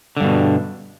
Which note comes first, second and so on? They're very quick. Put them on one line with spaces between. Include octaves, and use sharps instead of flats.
D3 G2 B2